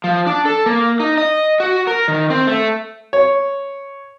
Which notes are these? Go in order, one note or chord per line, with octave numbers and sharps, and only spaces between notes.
F3
D4
A4
A#3
D#4
D#5
F#4
A#4
D#3
C4
A3
C#5